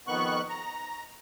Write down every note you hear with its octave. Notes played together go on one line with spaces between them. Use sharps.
F2 D#3 B3 C#6 F#6
A#5